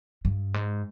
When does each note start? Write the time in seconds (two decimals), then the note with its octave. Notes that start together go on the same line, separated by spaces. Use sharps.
0.25 G2
0.54 G#2